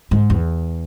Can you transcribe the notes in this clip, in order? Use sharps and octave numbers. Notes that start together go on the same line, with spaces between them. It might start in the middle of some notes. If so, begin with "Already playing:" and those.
G#2
E2